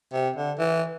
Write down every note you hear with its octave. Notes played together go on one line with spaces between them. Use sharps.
C3
D3
E3